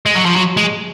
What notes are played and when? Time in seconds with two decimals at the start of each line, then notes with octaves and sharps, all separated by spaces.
0.06 G#3
0.15 F#3
0.26 F3
0.36 F#3
0.57 G#3